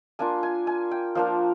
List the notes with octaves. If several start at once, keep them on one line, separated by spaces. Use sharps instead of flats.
A#3 D4 F4 G#5
G#5
G#5
G5
F3 A#3 D4 F5